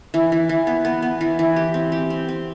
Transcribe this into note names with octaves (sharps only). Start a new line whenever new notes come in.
E3
E3
E3
B3
B3
B3
E3
E3
G4
C4
G4
C4
C4